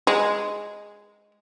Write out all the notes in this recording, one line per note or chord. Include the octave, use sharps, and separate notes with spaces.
G#3